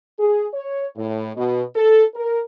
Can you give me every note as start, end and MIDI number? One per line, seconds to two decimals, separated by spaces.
0.19 0.46 68
0.54 0.88 73
0.97 1.31 45
1.36 1.62 47
1.76 2.03 69
2.14 2.40 70